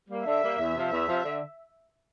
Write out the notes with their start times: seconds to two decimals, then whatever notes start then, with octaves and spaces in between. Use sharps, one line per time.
0.08 G3 A#3
0.25 D3 E5
0.41 G3 A#3
0.58 E2
0.74 C3 F3
0.90 E2 E5
1.07 C3 F3
1.24 D3